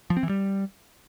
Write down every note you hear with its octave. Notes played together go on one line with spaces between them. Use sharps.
F3
C4
E3
G3